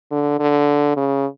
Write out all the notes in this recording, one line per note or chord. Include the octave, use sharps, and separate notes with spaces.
D3
D3
C#3